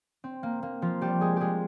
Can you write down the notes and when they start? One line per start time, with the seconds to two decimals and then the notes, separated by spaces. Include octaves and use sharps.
0.24 C4
0.43 A#3
0.63 A#3
0.82 F3 F4
1.01 G3 G4
1.21 G#3 G#4
1.36 G#3 G4 G#4